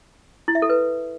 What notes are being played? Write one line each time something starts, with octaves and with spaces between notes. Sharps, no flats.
E4
E5
A4
B4